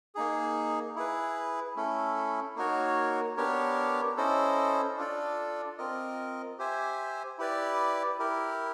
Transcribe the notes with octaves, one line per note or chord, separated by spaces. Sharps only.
A#3 D#4 G#4
E4 G#4 B4
A3 C#4 E4 A4
A#3 D#4 F#4 A#4 C#5
B3 D4 G4 A#4 C#5
C#4 E4 A4 C5 D#5
D4 F4 A4 D5
C4 F4 A#4 D#5
G4 C5 E5 G#5
E4 G4 B4 D5
E4 G4 A#4